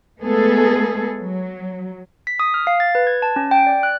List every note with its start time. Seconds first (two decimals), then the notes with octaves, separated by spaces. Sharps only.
0.20 G#3 A3 B3 G#4 A4
1.19 F#3
2.27 B6
2.39 D#6
2.54 F6
2.67 F5
2.80 A6
2.95 B4
3.07 G#6
3.22 A5
3.36 C#4
3.51 G5
3.67 D5
3.83 F#6